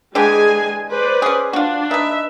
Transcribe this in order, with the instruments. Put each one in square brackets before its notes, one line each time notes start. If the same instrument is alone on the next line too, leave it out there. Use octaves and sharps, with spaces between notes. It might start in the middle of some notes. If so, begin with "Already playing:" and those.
[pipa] D3 E3 G4 [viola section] G#3 G#4 G#5
[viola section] B4 C5 D5
[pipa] C#4 G#4
[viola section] D4 [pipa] F4 F#4
[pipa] D#4 B4 [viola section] E5